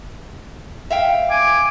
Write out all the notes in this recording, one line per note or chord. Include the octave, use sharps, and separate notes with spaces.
E5 F5 G5
G#5 D6